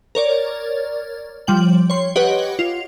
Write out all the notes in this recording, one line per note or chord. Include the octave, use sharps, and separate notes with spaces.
A#4 C#5 D5
F3 G3 G5 F#7
C#5 C6
G4 B4 C#5 D#5 F#5
F4